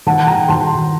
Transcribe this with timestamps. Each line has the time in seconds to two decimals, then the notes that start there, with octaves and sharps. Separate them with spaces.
0.06 D#3 F#5 A5
0.27 D#3 G5 A#5
0.49 D#3 A5 C6